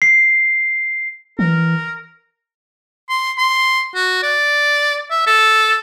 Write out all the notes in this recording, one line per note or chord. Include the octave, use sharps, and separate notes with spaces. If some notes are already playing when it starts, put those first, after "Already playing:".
C7
E3 A#4
C6
C6
F#4
D5
E5
A4